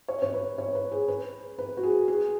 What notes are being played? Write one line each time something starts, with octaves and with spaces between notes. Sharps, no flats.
C#5
C#5
B4
C#5
B4
G#4
B4
B4
F#4
G#4
G#4